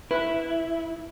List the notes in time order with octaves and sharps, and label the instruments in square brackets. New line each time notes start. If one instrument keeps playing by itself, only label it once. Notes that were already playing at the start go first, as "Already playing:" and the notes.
[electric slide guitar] E4 [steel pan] B4